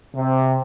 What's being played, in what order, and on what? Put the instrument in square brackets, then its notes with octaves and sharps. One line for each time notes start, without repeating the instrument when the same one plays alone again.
[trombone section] C3